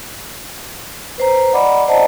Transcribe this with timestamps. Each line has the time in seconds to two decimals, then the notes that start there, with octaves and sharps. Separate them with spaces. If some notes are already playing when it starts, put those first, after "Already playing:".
1.18 B4 C5 A#5
1.53 D5 D#5 F#5 A#5 B5 D6
1.88 C5 D5 D#5 F#5 A5 A#5